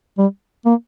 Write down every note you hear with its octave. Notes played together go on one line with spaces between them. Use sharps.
G3
A#3